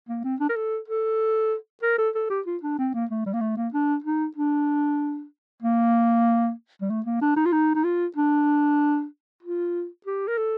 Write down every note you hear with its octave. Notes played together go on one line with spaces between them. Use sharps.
A#3
C4
D4
A#4
A4
A4
A#4
A4
A4
G4
F4
D4
C4
A#3
A3
G3
A#3
A3
A#3
D4
D#4
D4
A#3
G3
A3
A#3
D4
D#4
F4
D#4
D#4
F4
D4
F4
G4
A#4
A4